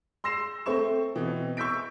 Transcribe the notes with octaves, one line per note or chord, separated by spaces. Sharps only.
C6 E6 A#6 C7 E7
A3 C4 C5 C#6 E7
B2 E3 C4
C#6 E6 G6 B6 D7